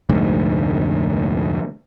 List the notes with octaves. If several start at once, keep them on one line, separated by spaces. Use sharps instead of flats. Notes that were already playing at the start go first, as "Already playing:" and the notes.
F1 D2 G#2